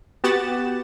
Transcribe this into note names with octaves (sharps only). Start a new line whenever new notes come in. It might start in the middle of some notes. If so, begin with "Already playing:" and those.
B3 F#4 G4 F#5 A6 E7